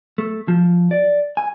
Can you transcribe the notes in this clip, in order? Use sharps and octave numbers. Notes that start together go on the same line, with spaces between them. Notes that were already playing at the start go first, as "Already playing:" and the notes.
A3
F3
D5
G#5